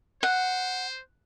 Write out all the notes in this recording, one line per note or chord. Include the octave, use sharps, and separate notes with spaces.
C5 F#5